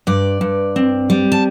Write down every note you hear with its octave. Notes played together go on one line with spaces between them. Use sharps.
G2 D5
G2
C4
G3
A5